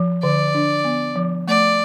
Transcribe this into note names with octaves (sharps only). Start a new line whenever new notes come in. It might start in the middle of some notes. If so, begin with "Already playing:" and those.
Already playing: F3
D3 D5
D4
B3
F3
A3 D5